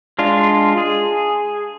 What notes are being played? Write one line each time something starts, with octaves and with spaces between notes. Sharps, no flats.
G#3 D4 F4
G#4